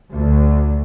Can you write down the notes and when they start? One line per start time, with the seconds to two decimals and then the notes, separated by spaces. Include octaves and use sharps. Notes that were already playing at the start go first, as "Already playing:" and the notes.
0.15 D2